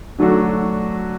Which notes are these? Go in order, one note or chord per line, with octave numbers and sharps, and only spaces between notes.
D3 F#3 A3 D4 F#4